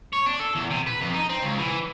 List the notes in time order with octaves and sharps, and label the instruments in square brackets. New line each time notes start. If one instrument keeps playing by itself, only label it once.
[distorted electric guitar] C#5
D4
A4
E2
C3
B4
F2
D#4
C4
C#2
E3